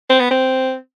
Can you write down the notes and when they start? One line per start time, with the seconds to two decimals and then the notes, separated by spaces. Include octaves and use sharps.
0.10 C4
0.20 B3
0.31 C4